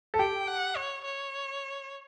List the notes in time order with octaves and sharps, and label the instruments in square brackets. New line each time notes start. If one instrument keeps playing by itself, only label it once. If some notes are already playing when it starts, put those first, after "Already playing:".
[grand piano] A4
[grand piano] G4 [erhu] G5
[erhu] F#5
C#5
C#5